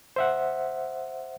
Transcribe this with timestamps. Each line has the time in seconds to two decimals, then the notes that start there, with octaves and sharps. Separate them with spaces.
0.16 C5 E5 F#5